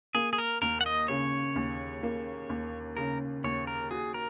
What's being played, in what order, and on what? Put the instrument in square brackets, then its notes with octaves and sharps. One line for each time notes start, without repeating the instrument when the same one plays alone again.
[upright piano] A#3 [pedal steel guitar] G#4
[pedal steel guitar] G#4
A#4
[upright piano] D#2 [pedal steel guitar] A#4
[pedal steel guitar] F#5
D#5
[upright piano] C#3 [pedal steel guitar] C#5
[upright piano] D#2
A#3
D#2
[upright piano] C#3 [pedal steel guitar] A#4
[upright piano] D#2 [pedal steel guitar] C#5
[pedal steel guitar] A#4
[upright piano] F#4 [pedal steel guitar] G#4
[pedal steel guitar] A#4